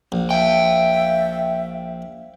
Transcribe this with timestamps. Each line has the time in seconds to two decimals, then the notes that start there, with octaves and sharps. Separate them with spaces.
0.12 A#1
0.31 E5 F5 G5